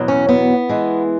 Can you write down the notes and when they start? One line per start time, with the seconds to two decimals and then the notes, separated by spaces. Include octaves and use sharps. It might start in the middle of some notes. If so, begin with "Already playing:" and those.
Already playing: E2 B2 F#3
0.08 C#4
0.29 B3
0.69 E3 G#3